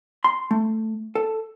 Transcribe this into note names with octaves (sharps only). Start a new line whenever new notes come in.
C6
A3
A4